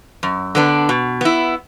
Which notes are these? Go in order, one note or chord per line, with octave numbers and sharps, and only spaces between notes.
F#2
D3 B3 D4
B2
B3 E4